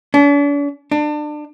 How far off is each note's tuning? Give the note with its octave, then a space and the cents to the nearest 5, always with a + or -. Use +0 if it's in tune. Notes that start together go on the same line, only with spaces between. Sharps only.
D4 -45
D4 +30